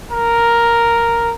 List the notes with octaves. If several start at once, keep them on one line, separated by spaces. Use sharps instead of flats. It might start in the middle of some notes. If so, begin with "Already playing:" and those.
A#4